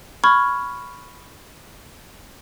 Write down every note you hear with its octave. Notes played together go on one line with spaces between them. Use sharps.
B5 C#6 F6 G#6